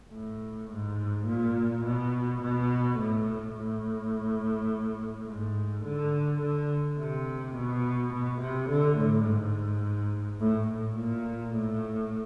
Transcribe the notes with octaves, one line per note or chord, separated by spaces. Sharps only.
A2
G#2
A#2
B2
B2
A2
A2
G#2
D3
D3
C3
B2
B2
C3
D3
A2
G#2
A2
A2
A#2
A2